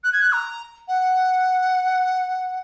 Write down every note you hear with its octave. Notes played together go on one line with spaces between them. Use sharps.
F#6
G#6
F#6
A#5
F#5